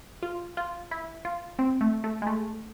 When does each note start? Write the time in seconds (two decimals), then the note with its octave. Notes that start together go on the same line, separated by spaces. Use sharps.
0.23 F4
0.57 F4
0.91 E4
1.25 F4
1.59 C4
1.81 A3
2.04 A3
2.22 G#3
2.27 A3